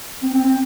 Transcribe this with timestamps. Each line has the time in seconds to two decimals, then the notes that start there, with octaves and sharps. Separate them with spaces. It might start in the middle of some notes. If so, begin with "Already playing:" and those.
0.23 C4
0.34 C4
0.44 C4